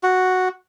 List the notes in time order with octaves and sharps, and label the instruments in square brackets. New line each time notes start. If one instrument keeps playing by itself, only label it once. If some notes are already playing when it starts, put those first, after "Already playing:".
[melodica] F#4